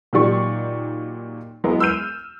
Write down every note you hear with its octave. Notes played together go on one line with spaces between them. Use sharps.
A#2 D#3 F#3 G4 D5 C#6
F#3 G#3 B3 E4 A#4
E6 F6 G6 D#7